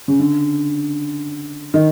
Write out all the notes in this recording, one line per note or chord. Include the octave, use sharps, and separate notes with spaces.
C#3
D3
D#3